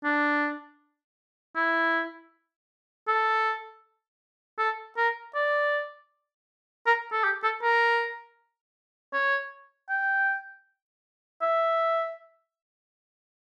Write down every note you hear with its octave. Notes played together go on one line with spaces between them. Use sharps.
D4
E4
A4
A4
A#4
D5
A#4
A4
G4
A4
A#4
C#5
G5
E5